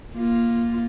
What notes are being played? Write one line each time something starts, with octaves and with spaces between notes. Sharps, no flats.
A#3 F4